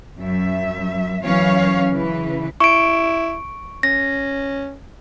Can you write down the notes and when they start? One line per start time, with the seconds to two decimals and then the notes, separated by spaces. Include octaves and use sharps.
0.19 F#2 E5
1.23 F#2 E3 C#4 C#5 F5
1.92 C#3 E3 B4
2.60 E4 C#6 D7
3.83 C#4 A#6